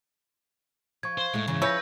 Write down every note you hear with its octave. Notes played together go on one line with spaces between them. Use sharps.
F3 C#6 G#6
C5
A2 G#3 A3
E2 G#2 C#3 E3
C#3 F3 E4 B4 C#5 E6 G6 A#6